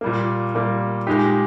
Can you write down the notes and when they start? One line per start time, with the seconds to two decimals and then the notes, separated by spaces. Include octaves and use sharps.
0.01 A#2 G3 A#3
0.54 A#2 G3 A#3
1.07 A#2 G#3 D#4 G4